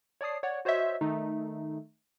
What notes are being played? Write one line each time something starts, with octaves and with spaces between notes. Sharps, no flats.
C#5 D5 A5 D#6 C7
C#5 D5 F#5
F#4 C5 C#5 D#5 E5
D#3 A3 D#4